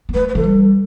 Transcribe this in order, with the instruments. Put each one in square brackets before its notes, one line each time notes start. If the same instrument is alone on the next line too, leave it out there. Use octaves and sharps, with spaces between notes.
[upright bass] B3
[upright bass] A3 [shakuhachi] B4
[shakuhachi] B4
[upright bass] E3 [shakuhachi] A4
[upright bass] G3